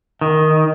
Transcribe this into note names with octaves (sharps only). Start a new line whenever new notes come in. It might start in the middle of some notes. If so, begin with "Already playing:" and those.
D#3